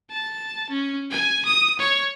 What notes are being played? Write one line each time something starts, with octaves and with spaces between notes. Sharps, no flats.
A5
C#4
G#5
D#6
C#5